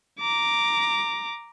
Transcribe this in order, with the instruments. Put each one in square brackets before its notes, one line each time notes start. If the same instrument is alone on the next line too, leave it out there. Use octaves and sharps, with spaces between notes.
[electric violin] A#5 D6